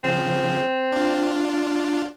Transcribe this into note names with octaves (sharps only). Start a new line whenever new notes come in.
C#3 F3 C4
D4 F4